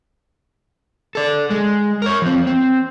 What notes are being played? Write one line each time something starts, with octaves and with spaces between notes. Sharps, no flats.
A4 D5
G#3
A#4 C#5
F3 C4
C4